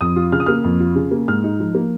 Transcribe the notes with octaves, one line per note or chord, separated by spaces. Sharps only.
F2 D#6
F4
C#3 F6
D#6
A#3 F6
F2
F4
C#3
A#3
G#2 F6
D#4
F3
A#3